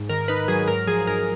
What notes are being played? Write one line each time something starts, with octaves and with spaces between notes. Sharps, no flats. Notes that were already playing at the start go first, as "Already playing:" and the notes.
Already playing: G#2
D#3 A#4
D#4 B4
F#3 G#4
G#2 A#4
F3 G#4
G#2 A#4